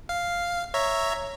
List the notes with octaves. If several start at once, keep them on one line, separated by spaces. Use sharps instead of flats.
F5
C#5 E5 A#5